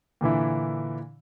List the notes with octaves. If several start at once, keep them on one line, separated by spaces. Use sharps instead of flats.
A#2 D3 E3 E4